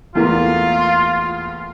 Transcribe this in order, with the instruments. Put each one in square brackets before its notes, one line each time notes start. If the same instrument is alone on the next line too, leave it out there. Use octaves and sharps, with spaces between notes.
[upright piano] E2 A3 A#3 [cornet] F4